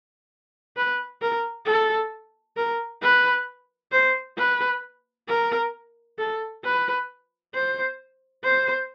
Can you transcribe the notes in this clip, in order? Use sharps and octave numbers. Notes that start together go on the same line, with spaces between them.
B4
A#4
A4
A#4
B4
C5
B4
A#4
A4
B4
C5
C5